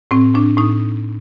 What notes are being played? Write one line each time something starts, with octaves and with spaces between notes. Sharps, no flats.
A2 C4
A2 D4
A2 D#4